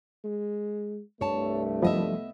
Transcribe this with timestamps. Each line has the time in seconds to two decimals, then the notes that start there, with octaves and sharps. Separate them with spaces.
0.24 G#3
1.21 C2 G2 A3 C#5 A5
1.82 F3 G3 B3 D#5 E5